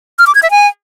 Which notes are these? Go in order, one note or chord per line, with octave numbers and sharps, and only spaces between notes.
F6
D6
G#6
E5
G#5